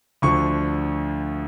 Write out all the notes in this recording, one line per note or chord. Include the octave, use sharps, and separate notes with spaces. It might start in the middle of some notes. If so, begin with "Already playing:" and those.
D2 D3 F3 C#6